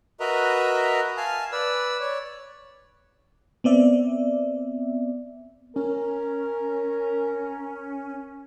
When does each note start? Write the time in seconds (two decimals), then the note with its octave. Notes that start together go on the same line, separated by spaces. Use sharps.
0.20 F#4 A#4 B4 D#5 E5 A#5
1.17 F5 G#5 A5 F6
1.52 B4 D5 E6
2.00 C#5 D5
3.64 B3 C4 D5 E5
5.76 C#4 A#4